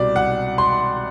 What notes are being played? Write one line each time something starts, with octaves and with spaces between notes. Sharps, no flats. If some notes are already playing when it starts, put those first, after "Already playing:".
Already playing: C2 B2 D5
F#5
C6